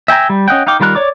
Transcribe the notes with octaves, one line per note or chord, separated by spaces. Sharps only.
E5 G5 G#5 A#5
G3
C#4 D#5 F#5 G5
D#4 F5 G5 D6
D#3 G3 F4 A#4 F#6
C#5 D5 D6